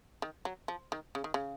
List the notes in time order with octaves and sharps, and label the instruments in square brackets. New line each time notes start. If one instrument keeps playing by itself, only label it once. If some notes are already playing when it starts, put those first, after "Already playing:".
[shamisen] D#3
F#3
F3
D#3
C#3
D#3
C#3